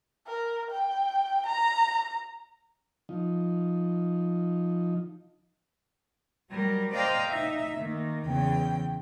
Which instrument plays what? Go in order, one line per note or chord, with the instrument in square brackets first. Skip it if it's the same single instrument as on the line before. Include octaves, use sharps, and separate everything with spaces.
[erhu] A#4
G5
A#5
[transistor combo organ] F3 D#4
[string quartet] F#3 G3 A#4
C5 D5 D#5 F5 G5 A#5
D#4 E5
D#3 A#3
E2 C#3 G5